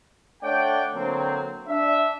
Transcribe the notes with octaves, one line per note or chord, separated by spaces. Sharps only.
A3 D4 C#5 D5 F#5 G5
D3 F#3 A#3 C4
D4 E5